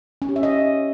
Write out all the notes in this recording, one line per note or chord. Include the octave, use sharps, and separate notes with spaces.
C#4
G4
E5
D#5